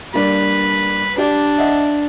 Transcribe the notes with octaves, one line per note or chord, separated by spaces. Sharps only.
G3 A#3 D4 B4
D4 G4 D5
D#5 E5 F#5